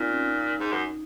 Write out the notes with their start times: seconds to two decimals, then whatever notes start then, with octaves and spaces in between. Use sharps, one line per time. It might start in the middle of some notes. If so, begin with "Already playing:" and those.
Already playing: A#2 C4 D#4 F4
0.09 C#4
0.26 D#4
0.60 G#2
0.72 F#2